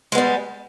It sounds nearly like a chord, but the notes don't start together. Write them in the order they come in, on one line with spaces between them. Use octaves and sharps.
G#3 B3 G3